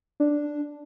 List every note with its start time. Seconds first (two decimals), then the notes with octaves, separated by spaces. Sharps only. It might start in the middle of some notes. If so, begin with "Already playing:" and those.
0.20 D4